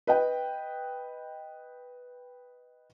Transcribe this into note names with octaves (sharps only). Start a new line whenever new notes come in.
B4 D#5 G5